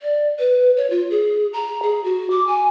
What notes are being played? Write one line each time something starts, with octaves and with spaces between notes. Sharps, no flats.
D5
B4
C#5
F4
G#4
A#5
G#4
F#4
D6
G#5